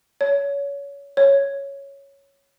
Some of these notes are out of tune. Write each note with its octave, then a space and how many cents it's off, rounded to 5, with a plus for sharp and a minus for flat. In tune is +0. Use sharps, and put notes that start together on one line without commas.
C#5 +25
C#5 +0